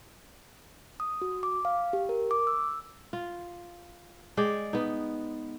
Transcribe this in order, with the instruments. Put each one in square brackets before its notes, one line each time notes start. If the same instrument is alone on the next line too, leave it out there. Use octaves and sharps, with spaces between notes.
[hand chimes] D#6
F#4
D6
F5
G4
A#4
D6
E6
[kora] F4
G#3 D5 G5
B3 D#4